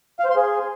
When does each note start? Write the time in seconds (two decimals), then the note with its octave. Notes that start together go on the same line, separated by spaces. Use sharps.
0.20 F5
0.25 C5
0.30 C6
0.36 G#4